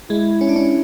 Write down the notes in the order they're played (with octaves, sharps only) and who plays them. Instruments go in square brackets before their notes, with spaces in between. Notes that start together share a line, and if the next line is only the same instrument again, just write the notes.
[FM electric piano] G#3 [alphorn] E4
[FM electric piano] C#4
D4
C#4